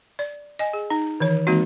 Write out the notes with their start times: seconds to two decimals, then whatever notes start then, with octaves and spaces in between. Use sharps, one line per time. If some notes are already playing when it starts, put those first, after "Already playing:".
0.19 D5
0.59 D#5 G#5
0.73 G#4
0.90 D#4
1.20 D#3 E3 C#5
1.47 E3 G#3 A#3 C4 D#4 F#4